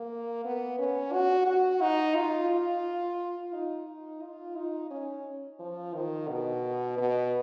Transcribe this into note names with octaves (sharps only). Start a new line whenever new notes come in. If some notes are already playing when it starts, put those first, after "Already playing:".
Already playing: A#3
B3
C#4
F#4
F#4
D#4
F4
F4
D#4
F4
D#4
C#4
F3
D#3
B2
B2